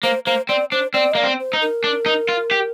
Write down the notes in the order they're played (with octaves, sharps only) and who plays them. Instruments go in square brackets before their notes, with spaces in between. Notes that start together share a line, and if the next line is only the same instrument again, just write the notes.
[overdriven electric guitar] A#3 [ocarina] C5
[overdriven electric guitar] A#3 [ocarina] C5
[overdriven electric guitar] C4 [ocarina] D5
[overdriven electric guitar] D4 [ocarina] C5
[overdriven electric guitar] C4 [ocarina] D5
[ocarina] D#5
[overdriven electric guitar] A#3 [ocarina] D5
[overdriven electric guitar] C4
[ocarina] C5
[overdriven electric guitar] D#4
[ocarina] A#4
[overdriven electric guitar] D4
D#4
F4
G4